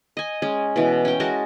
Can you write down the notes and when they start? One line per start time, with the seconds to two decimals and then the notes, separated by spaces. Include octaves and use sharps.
0.17 D#5 G#5
0.42 G#3 C#4
0.76 B2 E3
1.05 C#4 G5
1.20 G#3 F#4 A#4 A5